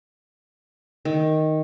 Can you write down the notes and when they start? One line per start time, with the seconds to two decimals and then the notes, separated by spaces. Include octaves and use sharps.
1.05 D#3